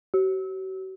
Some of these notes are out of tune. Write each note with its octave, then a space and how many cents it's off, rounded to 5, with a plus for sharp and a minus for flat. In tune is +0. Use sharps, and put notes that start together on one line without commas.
F#4 +45